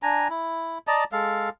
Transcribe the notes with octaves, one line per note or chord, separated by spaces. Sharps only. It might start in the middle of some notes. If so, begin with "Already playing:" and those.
D4 G#5 A#5
E4
D5 D#5 A5 A#5
G#3 A4 F5